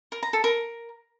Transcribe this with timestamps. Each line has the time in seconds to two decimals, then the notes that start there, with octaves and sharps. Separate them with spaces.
0.12 A#4
0.23 A#5
0.33 A4
0.44 A#4